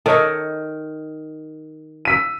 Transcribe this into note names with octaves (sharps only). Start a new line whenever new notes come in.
D#3 A4 C#5 D#5
E6 B6 D#7